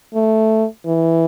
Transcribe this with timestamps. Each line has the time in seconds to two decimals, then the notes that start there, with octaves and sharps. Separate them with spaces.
0.14 A3
0.86 E3